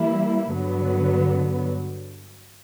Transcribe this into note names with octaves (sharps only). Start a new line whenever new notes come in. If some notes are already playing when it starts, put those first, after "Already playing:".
Already playing: E3 G3 A#3 E4
G2 D3 F#3 B3